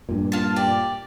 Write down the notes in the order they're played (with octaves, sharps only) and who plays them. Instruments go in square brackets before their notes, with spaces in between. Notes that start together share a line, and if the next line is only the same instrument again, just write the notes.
[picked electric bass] G2 A#2
[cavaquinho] F4 A5
G4 D5